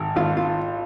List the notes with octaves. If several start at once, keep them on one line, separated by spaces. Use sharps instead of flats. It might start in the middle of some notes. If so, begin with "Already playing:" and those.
Already playing: G#1
G#1 F4
F4